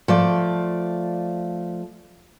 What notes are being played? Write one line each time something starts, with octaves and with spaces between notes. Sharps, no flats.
F3 A3 D5